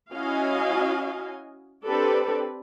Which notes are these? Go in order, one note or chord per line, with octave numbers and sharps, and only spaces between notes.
C#4 E4 F#4 D#5 F5 G#5
C4 D4 G4 A4 B4 D5